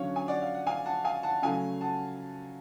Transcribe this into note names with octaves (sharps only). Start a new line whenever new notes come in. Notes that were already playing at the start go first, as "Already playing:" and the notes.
Already playing: D3 F#3 C#4 C#5 F5
G#5
D5 F#5
F5
F#5
F5 G#5
F#5 A5
F5 G#5
F#5 A5
C#3 F#3 A3 F5 G#5
F#5 A5